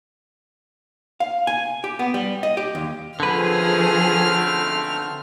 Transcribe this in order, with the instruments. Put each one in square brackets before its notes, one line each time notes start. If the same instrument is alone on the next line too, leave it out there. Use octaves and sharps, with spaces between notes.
[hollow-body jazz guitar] F5
G#5
G4
B3
G3
D#5
G4
D#2
[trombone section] B1 A3 C4 [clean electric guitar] D3 B4 [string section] F3 G#4 [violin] F6